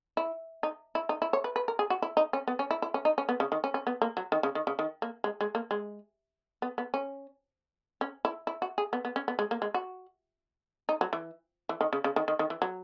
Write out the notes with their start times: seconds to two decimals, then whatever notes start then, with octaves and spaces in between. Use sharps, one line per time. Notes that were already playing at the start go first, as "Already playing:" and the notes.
0.17 E4
0.63 D#4
0.95 E4
1.09 D#4
1.22 E4
1.33 C#5
1.44 B4
1.56 B4
1.68 A#4
1.79 G#4
1.90 F#4
2.02 E4
2.17 D#4
2.33 C#4
2.48 B3
2.59 C#4
2.71 E4
2.82 E4
2.94 C#4
3.05 D#4
3.18 C#4
3.29 B3
3.40 C#3
3.52 D#3
3.64 C#4
3.74 C#4
3.87 B3
4.02 A#3
4.17 F#3
4.32 D#3
4.43 C#3
4.55 D#3
4.67 C#3
4.79 D#3
5.02 A#3
5.24 G#3
5.41 G#3
5.55 A#3
5.71 G#3
6.62 B3
6.78 B3
6.94 C#4
8.01 C#4
8.25 E4
8.47 E4
8.62 F#4
8.78 G#4
8.93 B3
9.05 B3
9.16 C#4
9.28 B3
9.39 G#3
9.51 A#3
9.62 G#3
9.74 F#4
10.89 D#4
11.01 F#3
11.13 E3
11.69 E3
11.81 D#3
11.93 C#3
12.04 C#3
12.16 D#3
12.28 D#3
12.39 D#3
12.50 E3
12.62 F#3